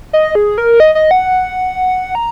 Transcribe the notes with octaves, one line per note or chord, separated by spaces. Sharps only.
D#5
G#4
A#4
D#5
D#5
F#5
A#5